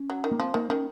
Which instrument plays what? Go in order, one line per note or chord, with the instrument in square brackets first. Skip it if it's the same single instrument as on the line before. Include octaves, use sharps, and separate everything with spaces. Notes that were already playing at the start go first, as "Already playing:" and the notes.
Already playing: [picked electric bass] C#4
[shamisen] F#3
D#3
[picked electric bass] A#3
[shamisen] F3 [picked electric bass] C4
[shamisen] D#3 [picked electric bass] A#3
[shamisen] D#3 [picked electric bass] C#4